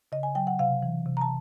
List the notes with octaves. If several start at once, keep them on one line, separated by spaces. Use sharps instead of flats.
C#3 D#5
G#5
F#3 G5
F#5
C3 F5
E3
C3
A#5
A5